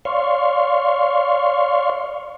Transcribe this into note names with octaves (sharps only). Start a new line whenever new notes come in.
C#5 D5 F5 C6 C#6 F6